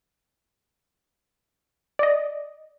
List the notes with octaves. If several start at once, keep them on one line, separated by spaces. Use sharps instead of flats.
D5 D#5